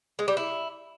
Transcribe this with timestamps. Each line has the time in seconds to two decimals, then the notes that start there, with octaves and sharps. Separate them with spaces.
0.19 G#3
0.28 G3
0.37 E4